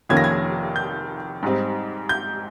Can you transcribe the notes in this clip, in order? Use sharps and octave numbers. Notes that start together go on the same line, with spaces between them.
F1 F2 D#3 A#3 C#4 G#6
A#6
G#6
G6
G#2 G3 C4 D#4
G6